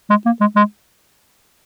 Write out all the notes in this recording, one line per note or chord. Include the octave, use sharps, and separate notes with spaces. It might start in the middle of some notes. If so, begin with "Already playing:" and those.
G#3
A#3
G#3
G#3